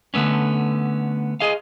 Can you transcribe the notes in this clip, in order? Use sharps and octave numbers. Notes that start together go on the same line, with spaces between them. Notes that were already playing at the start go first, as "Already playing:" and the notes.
D3 A3 B3 C#4
G#4 D#5 F5